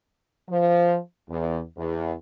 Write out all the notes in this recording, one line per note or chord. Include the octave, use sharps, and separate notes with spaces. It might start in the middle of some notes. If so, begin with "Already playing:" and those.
F3
E2
E2